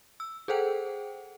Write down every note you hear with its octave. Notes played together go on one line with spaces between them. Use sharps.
E6
G#4 A4 C5 F#5 G5